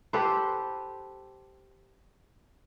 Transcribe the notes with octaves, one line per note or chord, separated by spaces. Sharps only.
G4 A4 B4 C5